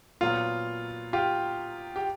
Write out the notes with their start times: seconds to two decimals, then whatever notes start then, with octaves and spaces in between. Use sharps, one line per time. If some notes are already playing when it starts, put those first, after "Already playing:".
0.21 A#2 F#3 B3 F4
1.13 F4 G4
1.96 G4